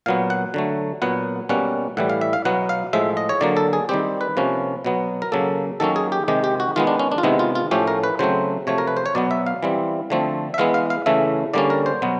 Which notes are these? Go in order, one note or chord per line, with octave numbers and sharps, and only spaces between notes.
A#2 F#3 B3 F5
F#5
D3 F#3 A3
A#2 F#3 B3 F#5
B2 G3 A#3 C#4 F#5
A2 E3 G3 F#5
F5
E5
F5
B2 F#3 B3 F#5
F5
A2 F3 G#3 E5
D#5
C#5
D3 F#3 A#3 D5
A4
G#4
D#3 G3 C4 G4
B4
C3 F3 A#3 C#4
B2 F#3 B3
A#4
C#3 F#3 A#3 A4
D#3 F#3 A#3 C#4 A4
G#4
G4
C3 D#3 G#3 G4
G4
F#4
D#3 G#3 B3 F4
D4
C#4
D4
F4
C3 D#3 G#3 B3 E4
F4
F4
A2 F3 A3 C#4 G4
A#4
B4
C#3 F#3 A3 C4 C5
C3 F3 A3 C#5
A#4
B4
C5
C#5
B2 F#3 B3 D5
E5
F5
E3 G3 C4
D3 F3 A3 C4
E5
E3 G#3 B3 F5
F5
F5
C#3 E3 A3 E5
D3 G3 A#3 C#4 D5
A#4
C5
B2 F#3 B3